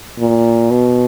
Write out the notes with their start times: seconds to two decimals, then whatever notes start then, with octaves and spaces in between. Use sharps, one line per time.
0.19 A#2
0.70 B2